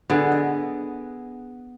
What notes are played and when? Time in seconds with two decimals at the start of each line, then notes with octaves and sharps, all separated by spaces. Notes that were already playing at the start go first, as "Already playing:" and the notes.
0.10 D3 B3 G#4
0.32 D#5